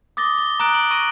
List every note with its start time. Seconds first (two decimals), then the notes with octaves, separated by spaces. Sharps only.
0.17 D6 D#6 A6 A#6 G7
0.38 G7
0.60 A#5 D#6 F#6 D7 F#7 G7
0.74 F#7
0.91 C#6 E6 A#6 D7 D#7